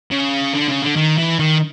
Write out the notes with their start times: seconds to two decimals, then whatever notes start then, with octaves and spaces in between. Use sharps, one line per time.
0.11 C#3
0.53 D3
0.68 C#3
0.82 D3
0.96 D#3
1.17 E3
1.39 D#3